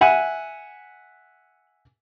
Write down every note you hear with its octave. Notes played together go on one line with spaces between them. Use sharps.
E5 F#5 G#5